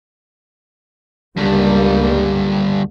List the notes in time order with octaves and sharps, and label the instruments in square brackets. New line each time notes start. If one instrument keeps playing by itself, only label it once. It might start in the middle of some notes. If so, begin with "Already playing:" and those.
[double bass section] C#2 G3 A#3 [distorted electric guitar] G2 D3